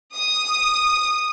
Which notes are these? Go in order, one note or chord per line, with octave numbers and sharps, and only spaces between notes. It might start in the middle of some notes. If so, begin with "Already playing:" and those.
D#6